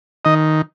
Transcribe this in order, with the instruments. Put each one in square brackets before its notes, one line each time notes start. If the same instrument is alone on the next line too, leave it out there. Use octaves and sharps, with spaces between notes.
[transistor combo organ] D#3 D#5